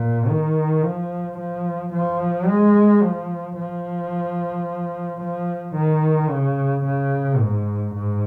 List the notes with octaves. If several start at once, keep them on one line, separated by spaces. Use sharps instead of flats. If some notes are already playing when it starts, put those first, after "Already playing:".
Already playing: A#2
D#3
F3
F3
F3
G#3
F3
F3
F3
D#3
C#3
C#3
G#2
G#2